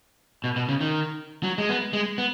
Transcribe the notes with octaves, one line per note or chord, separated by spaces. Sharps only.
B2
B2
C#3
D#3
F#3
G#3
B3
G#3
B3